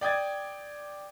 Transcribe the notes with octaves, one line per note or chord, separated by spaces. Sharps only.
D5 G5 D#6 G#6 A6